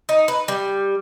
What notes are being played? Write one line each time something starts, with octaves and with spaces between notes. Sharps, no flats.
D#4
B4
G3